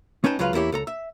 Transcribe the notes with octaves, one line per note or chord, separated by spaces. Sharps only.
A3 C#4 D#4 B4 G5 A5
C#2 F#3 G#3 F4 B4 F5
E2 A#3 E4 G4 C#5
C#2 A4 A#5
E5